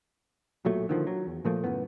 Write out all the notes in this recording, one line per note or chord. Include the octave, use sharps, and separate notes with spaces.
B1 A#2 F#3 A3
D3 D#3 F3
F#3
E2
A#2 F3 A3 A#3
F#1 F#2 A2 B3